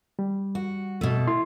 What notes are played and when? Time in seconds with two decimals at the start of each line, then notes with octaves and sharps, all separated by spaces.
0.19 G3
0.55 F#4
1.01 B2 A3
1.27 E4 C6